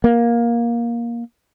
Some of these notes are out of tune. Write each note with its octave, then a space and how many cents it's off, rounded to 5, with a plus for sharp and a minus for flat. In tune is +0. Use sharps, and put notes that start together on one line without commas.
A#3 +15